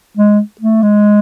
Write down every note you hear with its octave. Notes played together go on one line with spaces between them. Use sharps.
G#3
A3
G#3